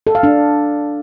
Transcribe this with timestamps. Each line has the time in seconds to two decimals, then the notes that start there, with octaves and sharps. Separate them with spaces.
0.07 A4
0.15 F5
0.23 D4